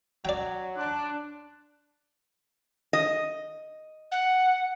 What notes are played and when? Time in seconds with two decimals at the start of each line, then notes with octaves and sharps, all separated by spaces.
0.25 F#3 D5 G5
0.76 D4 C6 D6 F#6
2.93 D#5
4.11 F#5